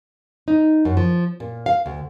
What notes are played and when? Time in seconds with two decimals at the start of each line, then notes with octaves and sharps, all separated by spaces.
0.48 D#4
0.85 F#2
0.97 F3
1.40 A#2
1.66 F5
1.86 D2